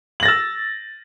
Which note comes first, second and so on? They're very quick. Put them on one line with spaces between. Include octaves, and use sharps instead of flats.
F#7 A#6 A6 E6